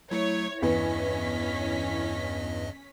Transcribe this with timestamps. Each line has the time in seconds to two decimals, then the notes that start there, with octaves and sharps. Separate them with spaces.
0.11 F#3 A3 E4 C#5 G#6
0.62 E2 G2 E3 B3 C#4 D#5 B6